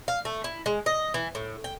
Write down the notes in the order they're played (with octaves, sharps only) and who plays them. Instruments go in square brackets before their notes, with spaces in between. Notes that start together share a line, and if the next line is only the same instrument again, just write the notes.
[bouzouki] F5
A3
E4
G#3
D#5
E3
A2
G5